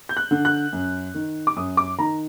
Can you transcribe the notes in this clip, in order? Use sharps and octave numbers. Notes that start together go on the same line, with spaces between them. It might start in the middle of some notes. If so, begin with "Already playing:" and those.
G6
F#6
D3
F#6
F#2
D#3
D6
F#2 D#6
D6
D#3 A#5